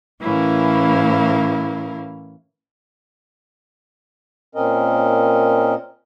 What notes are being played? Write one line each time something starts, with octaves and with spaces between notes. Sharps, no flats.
A2 E3 C#4 E4 A#4 F5
A#2 C4 C#4 A#4 D#5